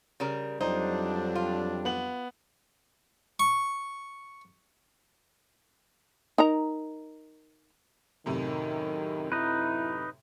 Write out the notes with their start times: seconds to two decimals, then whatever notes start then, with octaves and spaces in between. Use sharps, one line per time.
0.20 C#3 G3 A#4
0.61 F2 F#3 G3 D4 D#4 C5 D5
1.35 F4
1.85 B3 F#7
3.40 C#6
6.38 D#4 A#4 A#5
8.26 F#2 A2 C3 D#3
9.32 D#4 E4 B4